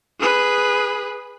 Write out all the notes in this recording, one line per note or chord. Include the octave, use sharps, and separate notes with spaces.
G#4 B4